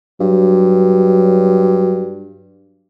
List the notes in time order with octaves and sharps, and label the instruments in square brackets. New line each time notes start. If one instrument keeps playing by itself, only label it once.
[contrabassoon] G2 [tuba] F#3